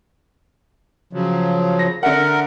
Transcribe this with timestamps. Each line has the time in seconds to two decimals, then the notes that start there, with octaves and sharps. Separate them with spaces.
1.13 C#3 F3 F#3
1.79 A#6
2.03 D3 A#4 E5 F#5